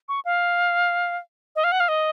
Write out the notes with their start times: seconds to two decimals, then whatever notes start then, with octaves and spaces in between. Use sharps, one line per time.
0.09 C#6
0.25 F5
1.56 D#5
1.64 F5
1.72 F#5
1.80 F5
1.88 D#5